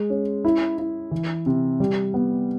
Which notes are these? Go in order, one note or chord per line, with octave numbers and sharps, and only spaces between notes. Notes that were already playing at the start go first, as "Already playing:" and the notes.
Already playing: G#3
C#4
E4
E4
E3
C3
G3
B3